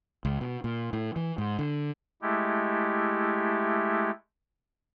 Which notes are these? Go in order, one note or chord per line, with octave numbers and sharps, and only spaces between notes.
C#2
B2
A#2
A2
E3
G#2
D3
G#3 A3 E4 G4